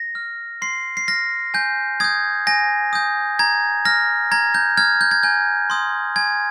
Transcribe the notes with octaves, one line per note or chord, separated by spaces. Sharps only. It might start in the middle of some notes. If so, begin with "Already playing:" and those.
Already playing: A#6
F6
C6 C7
C7
F6 A#6
G#5 G6
D#6 G6 G#6
G#5 A#6
D#6 G6
A#5 G#6
F6 A#6
A#5 G#6
G6
F6 G#6
G6
G#6
G#5 G6
C6 D#6 G6
G#5 G#6